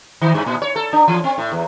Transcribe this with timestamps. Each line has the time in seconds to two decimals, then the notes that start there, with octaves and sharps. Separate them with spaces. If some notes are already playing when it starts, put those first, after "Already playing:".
0.21 D#3
0.34 G2
0.46 A#2
0.62 C#5
0.76 A4
0.93 D4
1.08 E3
1.24 C4
1.38 A2
1.52 E2